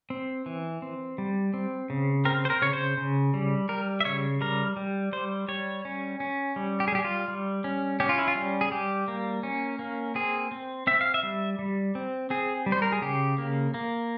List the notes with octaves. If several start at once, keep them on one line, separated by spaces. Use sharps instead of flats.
C4
E3
C4
G3
C4
C#3
C4 A#4
C5
A#4
C#3 C#5
C5
C#3
G3
G3 A#4
E5
C#3 C#5
G3 A#4
G3
G3 C5
G3 C#5
C#4
C#4
G3
G4
G#4
G3 G4
F4
G3
C#4
C#4 G4
F4
E4
F4
G3
G#4
G3 G4
A#3
C#4
A#3
C4 G#4
C4
C4 E5
F5
E5
G3
G3
C4
C4 G#4
G3
C5
A#4
G#4
C#3 G4
A#3
A#3